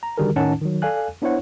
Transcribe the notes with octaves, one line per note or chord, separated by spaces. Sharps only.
A#5
D3 D#3 G3 F#4 G#4 A#4
A2 D#3 C#4 D#4 F#5 A5
D#3 F#3
A4 D5 F5 G#5 F#6
B3 D4 E4 C5 C#5 F#5